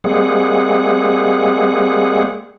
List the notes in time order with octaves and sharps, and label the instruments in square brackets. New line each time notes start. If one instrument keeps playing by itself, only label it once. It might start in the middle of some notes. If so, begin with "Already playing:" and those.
[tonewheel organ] G3 G#3 A#3 C4 G#4 F#5